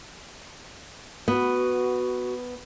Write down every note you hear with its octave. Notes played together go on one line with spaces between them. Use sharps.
B3 F#4